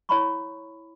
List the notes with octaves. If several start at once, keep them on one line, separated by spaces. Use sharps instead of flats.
E4 C#5 F5 A#5 B5 C#6